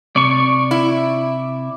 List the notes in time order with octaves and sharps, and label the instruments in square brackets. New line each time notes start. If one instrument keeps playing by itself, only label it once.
[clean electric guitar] C3 [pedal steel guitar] D5 C#6
[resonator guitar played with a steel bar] E4